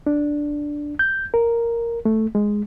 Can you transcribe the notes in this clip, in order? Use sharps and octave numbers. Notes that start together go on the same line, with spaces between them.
D4
G6
A#4
A3
G#3